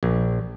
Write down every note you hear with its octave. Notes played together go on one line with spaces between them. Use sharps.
A#1